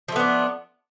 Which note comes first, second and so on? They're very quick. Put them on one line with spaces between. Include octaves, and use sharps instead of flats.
F3 A3 B3 D4